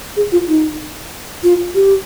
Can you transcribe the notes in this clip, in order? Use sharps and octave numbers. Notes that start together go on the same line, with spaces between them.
G#4
F4
D#4
F4
G4